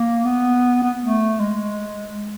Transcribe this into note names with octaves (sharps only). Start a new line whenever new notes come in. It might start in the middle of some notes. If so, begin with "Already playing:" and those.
Already playing: A#3
B3
B3
A3
G#3